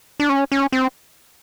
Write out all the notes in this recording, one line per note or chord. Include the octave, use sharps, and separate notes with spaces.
D4
C#4
C#4
C4